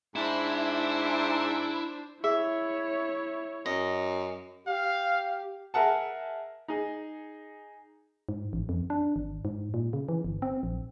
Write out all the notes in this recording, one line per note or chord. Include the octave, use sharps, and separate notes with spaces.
G#2 D4 E4 C5
E4 G#4 C#5 E5
F#2 D#5
G4 F5
G#4 A#4 E5 F#5 A5
D#4 G#4
G#2
A1
F2
D4
G#1
G#2
A#2
C#3
E3
G1
C4
A#1